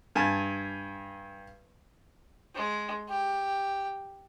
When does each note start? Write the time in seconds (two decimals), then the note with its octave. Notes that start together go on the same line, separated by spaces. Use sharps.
0.15 G2 G#5 A5
2.55 G#3
3.09 G4